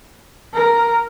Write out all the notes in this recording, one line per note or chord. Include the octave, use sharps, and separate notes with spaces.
A#4